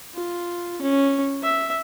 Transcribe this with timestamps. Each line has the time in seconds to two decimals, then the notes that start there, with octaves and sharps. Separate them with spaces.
0.15 F4
0.81 C#4
1.43 E5